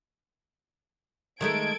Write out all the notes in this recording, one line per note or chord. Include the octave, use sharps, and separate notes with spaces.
D#3 G#3 A3 A4 G#6 D7